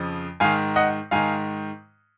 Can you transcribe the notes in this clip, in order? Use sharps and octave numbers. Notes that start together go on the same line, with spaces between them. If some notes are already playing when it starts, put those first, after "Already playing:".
Already playing: F2 C#3 F3
G#2 D#3 F5 G#5
D#5 F#5
G#2 D#3 F5 G#5